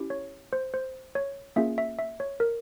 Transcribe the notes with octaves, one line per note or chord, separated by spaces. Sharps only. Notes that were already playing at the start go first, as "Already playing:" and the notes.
Already playing: C#4 E4 G4
C#5
C5
C5
C#5
A#3 C#4 F4 G#4 E5
E5
E5
C#5
A#4